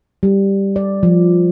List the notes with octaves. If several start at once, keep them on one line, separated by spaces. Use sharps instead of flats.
G3
D5
F3